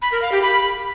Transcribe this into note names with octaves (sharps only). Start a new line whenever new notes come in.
B5
A#4
F5
G4
B5